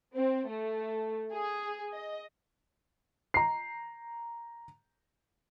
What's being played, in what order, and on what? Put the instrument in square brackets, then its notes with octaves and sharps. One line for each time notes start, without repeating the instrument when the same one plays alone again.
[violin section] C4
A3
G#4
D#5
[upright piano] A#5 C7